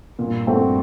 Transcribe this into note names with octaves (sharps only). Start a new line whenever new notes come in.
G2 A#2
A3 C4 F#4